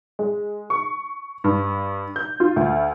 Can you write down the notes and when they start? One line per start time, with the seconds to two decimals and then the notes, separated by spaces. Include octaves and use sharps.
0.19 G#3
0.70 C#6
1.44 G2
2.16 G6
2.40 F4
2.56 D2